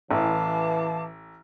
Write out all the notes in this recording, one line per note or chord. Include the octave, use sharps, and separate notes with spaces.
A1 E3 F5 A5 D6